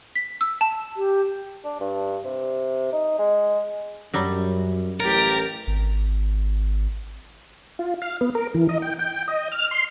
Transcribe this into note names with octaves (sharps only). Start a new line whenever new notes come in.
B6
E6
A5
G4
D4
G2
C3
D#4
G#3
F#2 F#3 G3
A1 G4 A#4 A6
G#1
F4
F5
B3
A#4
E3
D#5
G5
G5
D#5
F6
C6